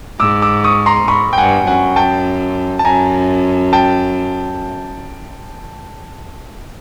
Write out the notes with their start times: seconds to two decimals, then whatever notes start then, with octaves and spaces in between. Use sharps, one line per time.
0.20 G#2 D6 E6
0.42 D6 E6
0.64 C#6 D#6
0.86 A#5 C6
1.08 G#2 B5 C#6
1.33 G5
1.38 G2 F#5 G#5
1.66 F#2 F#5 G#5
1.96 G5 A5
2.79 A5
2.85 F#2 G#5 A#5
3.73 G5 A5